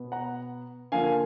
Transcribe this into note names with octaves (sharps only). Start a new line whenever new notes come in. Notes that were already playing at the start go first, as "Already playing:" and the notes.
Already playing: B2 B3
F#5 A#5
D3 F3 A#3 F5 G#5